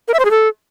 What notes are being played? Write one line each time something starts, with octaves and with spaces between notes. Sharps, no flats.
A#4
E5
C5
G#4
A4